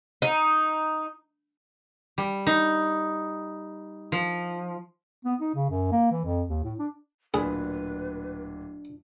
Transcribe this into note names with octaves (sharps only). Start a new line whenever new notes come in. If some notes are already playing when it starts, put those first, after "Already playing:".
D#4
G3
D#4
F3
B3
D#4
C#3
F#2
A#3
E3
F2
D#2
A2
D4
D1 A#2 D4 G#4 B4 B5